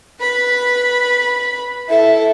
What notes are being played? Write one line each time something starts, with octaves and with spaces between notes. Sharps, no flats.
B4 B5
E4 A4 E5